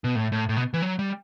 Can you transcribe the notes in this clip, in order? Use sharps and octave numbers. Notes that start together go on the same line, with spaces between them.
B2
A2
A2
A2
B2
E3
F#3
G3